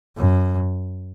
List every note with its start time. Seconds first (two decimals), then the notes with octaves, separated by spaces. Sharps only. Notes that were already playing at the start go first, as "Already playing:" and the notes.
0.17 F#2